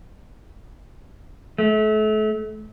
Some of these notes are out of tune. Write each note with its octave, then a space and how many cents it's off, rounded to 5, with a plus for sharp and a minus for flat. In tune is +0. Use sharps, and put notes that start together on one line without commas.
A3 -35